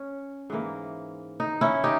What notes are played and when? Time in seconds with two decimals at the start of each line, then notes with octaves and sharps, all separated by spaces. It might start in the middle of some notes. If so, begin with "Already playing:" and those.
Already playing: C#4
0.50 G#2 E3 A#3
1.40 D#4
1.61 C#4 E4
1.84 D#4 G4